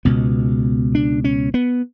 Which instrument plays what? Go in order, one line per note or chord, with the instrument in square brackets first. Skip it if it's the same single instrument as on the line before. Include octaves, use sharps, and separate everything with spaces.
[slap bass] C#2 B2 B3
D4
C#4
B3